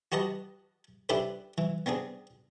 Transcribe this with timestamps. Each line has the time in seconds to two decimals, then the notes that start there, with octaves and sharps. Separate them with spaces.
0.12 F#4 G4 B4 D#5 A5
1.09 D4 E4 G4 A4 B4 C5
1.58 E3
1.86 B3 C4 D4 G#4